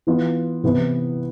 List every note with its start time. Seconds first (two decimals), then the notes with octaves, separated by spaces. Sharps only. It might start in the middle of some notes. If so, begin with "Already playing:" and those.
0.07 E3 B3 F4
0.64 C3 E3 B3 E4 B4